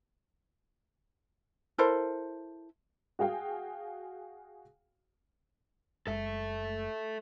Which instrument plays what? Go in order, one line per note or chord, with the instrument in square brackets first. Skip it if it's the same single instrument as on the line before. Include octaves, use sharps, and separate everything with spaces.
[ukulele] E4 A4 A#4 C5
[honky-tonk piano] F#4 G#4 F5 G5
[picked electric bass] F#1 G#3 [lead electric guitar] A4 E5